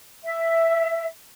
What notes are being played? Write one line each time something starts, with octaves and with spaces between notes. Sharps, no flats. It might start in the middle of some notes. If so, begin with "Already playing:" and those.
E5